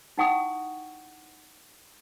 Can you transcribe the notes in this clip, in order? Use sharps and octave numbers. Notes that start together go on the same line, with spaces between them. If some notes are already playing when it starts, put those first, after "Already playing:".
D#4 E4 F#5 G5 C#6 D#6